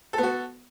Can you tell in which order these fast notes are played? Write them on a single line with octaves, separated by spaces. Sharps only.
A4 B3 F#4